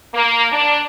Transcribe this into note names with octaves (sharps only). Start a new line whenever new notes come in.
A#3
D4